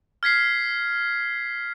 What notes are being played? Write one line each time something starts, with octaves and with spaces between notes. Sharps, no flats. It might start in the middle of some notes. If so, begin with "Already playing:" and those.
F6 G#6 B6 C7